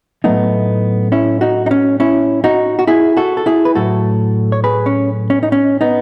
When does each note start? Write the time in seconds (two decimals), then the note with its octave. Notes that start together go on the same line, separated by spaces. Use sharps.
0.24 A2 F#3 A3 B3 D#4
1.12 C#4 E4
1.41 D#4 F#4
1.66 D#4
1.71 C#4
2.00 C#4 E4
2.44 D#4 F#4
2.79 F#4
2.87 E4 G#4
3.17 F#4 A4
3.37 A4
3.46 E4 G#4
3.65 B4
3.75 A2 F#3 A3 F#4 A4
4.52 C#5
4.64 G#4 B4
4.86 C#4
5.30 C#4
5.43 D#4
5.52 C#4
5.81 B3 D#4